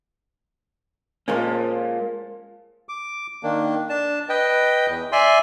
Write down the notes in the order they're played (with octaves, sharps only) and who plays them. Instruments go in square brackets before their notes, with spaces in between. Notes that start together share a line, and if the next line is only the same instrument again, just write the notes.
[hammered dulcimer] A#2 F3 F4 [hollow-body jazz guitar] G#3 A#3 C#4
[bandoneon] D6
D#3 A#3 D4
D4 A5
B4 D#5 G5
E2
D5 E5 G#5 C6